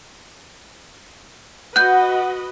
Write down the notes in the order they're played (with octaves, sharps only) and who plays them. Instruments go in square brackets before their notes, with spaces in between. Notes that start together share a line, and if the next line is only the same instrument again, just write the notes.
[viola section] F#4 B4 D#5 [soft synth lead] F#5 [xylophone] F#6 G6